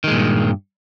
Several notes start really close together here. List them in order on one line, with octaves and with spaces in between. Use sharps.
D#3 G#3 A#2 G2